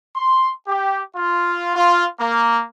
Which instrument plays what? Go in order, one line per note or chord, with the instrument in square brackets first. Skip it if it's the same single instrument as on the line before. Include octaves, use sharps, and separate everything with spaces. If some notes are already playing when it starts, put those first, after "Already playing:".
[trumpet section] C6
G4
F4
F4
A#3